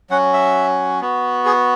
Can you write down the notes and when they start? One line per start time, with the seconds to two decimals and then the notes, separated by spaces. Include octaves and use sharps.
0.10 F#3 C#4 F#4 F#5
0.33 E5
1.01 B3 F#4
1.46 G#4